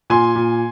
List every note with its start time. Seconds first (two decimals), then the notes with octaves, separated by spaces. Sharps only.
0.10 A#2 G#5 C6
0.36 A#2